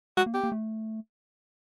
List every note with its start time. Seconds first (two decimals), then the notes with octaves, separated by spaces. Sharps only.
0.17 G#3 F#4
0.26 A#3
0.34 B3 G4
0.44 A#3
0.52 A3